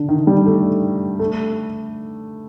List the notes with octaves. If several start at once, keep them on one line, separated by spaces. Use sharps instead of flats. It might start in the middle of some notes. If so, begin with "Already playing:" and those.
Already playing: D3
D#3
G3
A3
A3